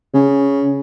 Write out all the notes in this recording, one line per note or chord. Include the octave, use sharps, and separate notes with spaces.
C#3